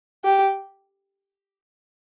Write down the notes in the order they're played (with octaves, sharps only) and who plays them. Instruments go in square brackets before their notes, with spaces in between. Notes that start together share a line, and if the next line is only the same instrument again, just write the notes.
[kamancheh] G4